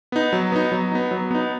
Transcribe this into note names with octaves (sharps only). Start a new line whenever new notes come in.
B3 D#4
F#3
B3 D#4
F#3
B3 D#4
F#3
B3 D#4